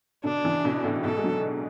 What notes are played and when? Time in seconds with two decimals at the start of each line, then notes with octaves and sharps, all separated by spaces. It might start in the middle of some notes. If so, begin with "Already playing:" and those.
0.24 B2 D3 D4
0.44 C#3 E3
0.64 B2 D3
0.84 A2 C#3
1.04 G#2 B2 A4
1.17 G#3
1.24 D3 F#3